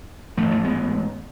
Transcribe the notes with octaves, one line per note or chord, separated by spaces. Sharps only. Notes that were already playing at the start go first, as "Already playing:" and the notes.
A1 G#2 F3 A3
F3 A3
G#3 B3